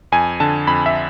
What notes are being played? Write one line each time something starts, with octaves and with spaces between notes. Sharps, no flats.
F2 G#5
D3 A5
F2 B5
E5